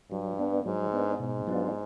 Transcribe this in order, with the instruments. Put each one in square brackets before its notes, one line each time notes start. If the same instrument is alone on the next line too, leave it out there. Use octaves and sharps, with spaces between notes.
[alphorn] G2 [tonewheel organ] F#3
[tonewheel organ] B3 D4
[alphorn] G#2 [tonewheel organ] F#3
[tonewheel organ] B3 D4
[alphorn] G#2 [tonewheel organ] B2
[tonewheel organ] F#3 B3 D4 F4